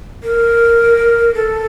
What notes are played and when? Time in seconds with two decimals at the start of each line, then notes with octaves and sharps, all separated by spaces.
0.23 A#4
1.35 A4